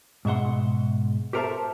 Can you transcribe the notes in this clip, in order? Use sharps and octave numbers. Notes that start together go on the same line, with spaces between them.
G#2 B2 E5 F#5 C6
G4 A4 A#4 C5 E5 A5